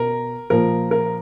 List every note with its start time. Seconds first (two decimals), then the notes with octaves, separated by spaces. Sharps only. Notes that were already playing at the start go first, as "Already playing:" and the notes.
Already playing: B2 A#4
0.50 A#2 F3 A#4
0.91 A#4